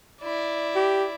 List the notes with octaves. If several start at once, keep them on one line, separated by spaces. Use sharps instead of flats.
E4 D5
G4